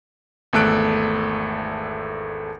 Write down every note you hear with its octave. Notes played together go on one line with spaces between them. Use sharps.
G#1 E2 A3 A4 F#6 D7